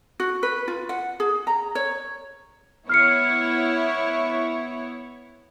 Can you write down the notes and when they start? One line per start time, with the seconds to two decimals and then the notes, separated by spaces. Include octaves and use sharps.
0.20 F#4
0.43 B4
0.68 F4
0.89 F#5
1.20 G#4
1.47 A#5
1.75 C#5
2.90 B3 E4 C#5 F6 C7 C#7